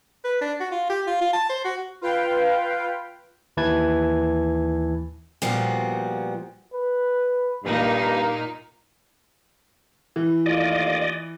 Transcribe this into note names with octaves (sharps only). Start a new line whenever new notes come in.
B4
D4
F#4
F4
G4
F4
F4
A5
C5
F#4
F4 B4 F5 G5
D#2 E3 B4 A5 G#6
A#2 F3 G3 B3 F#4
B4
G2 A#2 A#3 D#4
E3
D#2 A3 F4 D5 D#5